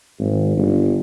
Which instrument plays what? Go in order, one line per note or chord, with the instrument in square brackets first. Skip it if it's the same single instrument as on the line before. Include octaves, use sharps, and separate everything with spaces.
[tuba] G#1
G1